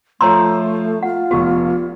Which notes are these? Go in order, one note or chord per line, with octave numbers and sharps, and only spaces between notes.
F3 A3 F4 C#5 A#5 C6 E6
F4 F#5
F1 B3 F#4 G4